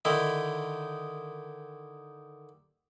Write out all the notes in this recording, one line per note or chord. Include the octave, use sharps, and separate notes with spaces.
D3 D#3 D#4 E4